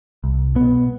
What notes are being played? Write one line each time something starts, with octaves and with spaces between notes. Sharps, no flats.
C2
B2 B3